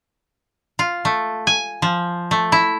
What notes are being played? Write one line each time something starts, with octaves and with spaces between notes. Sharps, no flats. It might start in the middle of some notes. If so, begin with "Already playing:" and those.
F4
A3
G#5
F3
A3
E4